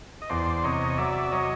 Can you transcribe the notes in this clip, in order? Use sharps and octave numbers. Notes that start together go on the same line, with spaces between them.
D#5
E2 C5 D5
C3 C#5 D#5
F#3 D5 E5
F#3 C#5 D#5